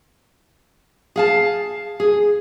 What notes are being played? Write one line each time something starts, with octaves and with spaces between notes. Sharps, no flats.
G#4 F5 A5
G#4